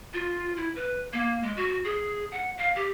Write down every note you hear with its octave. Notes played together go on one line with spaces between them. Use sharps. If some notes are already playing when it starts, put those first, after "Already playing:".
F4
E4
B4
A#3
G#3
F#4
G#4
F#5
F5
G4